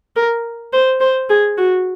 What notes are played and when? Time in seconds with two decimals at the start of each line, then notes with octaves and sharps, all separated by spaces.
0.16 A#4
0.73 C5
1.00 C5
1.30 G#4
1.58 F#4